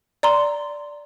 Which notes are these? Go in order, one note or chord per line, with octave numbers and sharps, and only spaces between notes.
D5 A#5 C6